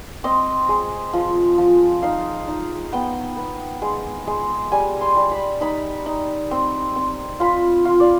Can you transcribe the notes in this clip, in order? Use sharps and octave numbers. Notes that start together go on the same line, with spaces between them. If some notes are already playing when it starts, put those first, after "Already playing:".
C4 D#5
G#3
F3
F3
D#4 F5
D#4
B3 G5
B3
G#3
G#3
G3 G#5
C6
G3
B5
D#4 B5
D#4
C4
C4
F4 B5
F4
D5